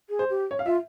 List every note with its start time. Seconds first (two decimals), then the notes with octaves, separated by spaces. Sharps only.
0.09 G#4
0.19 C5
0.30 G4
0.51 C#5
0.59 F5
0.66 F4 E5